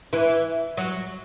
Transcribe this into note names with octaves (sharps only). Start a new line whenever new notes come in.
E3
F#3